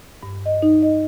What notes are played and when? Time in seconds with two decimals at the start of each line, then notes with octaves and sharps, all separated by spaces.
0.23 G2
0.46 D#5
0.62 D#4
0.82 D#5